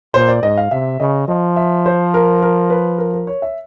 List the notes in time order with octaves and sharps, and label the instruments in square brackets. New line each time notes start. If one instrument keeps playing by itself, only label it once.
[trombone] A#2 [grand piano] C5
[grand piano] D5
[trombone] G#2 [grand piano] D#5
[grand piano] F5
[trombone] C3 [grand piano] E5
[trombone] C#3 [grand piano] D#5
[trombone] F3 [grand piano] D#5
[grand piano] E5
C5
A#4
A#4
B4
A#4
A#4
C#5
E5